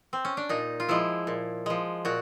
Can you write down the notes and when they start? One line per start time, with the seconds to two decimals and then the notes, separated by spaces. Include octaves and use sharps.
0.13 C4
0.25 C#4
0.37 D4
0.49 A#2 D#4
0.80 F4
0.89 F3 G#3 E4
1.27 A#2
1.66 F3 G#3
2.05 A#2 F#4